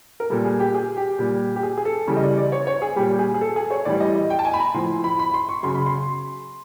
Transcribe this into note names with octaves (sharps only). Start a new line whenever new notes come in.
A#4
A#2 G3 A4
G#4
G4
G#4
G4
A#2 G3
G4
G#4
G#4
A4
C#3 E3 G3
D#5
D5
D5
C#5
C#5
G#4
A#2 G3 G4
G#4
G#4
A4
G#4
C#5
A2 E3 G3 D5
D#5
D#5
G5
A5
G#5
B5
A#5
A2 F3 C6
B5
B5
C6
C#6
C#3 F#3 C6
B5
C6